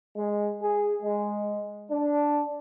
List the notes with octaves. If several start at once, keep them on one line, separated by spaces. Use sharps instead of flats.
G#3
G#4
G#3
D4